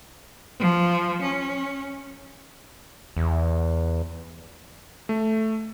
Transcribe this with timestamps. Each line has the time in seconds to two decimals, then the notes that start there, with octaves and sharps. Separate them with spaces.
0.59 F3
1.21 C#4
3.17 E2
5.09 A3